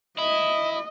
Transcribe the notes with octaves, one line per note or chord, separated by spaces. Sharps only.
E4 D#5